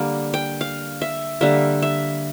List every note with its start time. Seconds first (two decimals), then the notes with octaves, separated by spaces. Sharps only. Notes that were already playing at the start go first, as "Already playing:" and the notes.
Already playing: D3 G3 A#3
0.34 G5
0.61 F5
1.01 E5
1.41 D3 G3 A#3 E5
1.82 E5